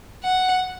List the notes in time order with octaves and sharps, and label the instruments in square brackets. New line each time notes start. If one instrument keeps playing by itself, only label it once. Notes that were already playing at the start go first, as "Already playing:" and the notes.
[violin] F#5